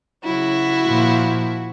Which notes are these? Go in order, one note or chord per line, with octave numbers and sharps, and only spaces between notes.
C#3 F#3 E4 F#4
A#2 F3